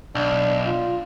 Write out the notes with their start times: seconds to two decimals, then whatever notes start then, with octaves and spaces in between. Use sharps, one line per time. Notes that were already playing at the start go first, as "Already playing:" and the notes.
0.15 B1 D4
0.67 F4